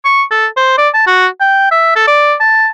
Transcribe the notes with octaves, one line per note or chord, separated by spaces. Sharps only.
C#6
A4
C5
D5
A5
F#4
G5
E5
A4
D5
A5